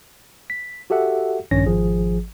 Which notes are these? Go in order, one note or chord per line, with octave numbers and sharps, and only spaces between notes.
B6
F#4 G4 A4 E5 F#5
A#1 G2 D#3 C#4 C#5 A#6
G#1 F3 G#4